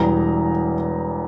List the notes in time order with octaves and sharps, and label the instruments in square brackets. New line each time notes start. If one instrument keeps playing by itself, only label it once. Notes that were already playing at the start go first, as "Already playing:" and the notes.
Already playing: [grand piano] E1 E2 E3 G3 A#5